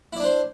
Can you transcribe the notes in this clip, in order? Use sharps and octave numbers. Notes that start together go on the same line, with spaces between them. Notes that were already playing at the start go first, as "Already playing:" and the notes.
D4 E4 C5 D5